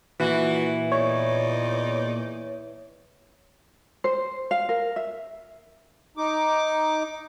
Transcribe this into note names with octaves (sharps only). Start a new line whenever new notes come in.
A#2 E3 F#4
E2 D#4 C#5 D5
C5
F5
A#4
E5
D#4 D6